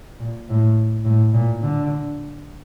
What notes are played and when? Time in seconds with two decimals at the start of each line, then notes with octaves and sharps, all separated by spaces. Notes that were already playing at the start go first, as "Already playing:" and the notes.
0.19 A#2
0.49 A2
1.05 A2
1.33 A#2
1.62 D3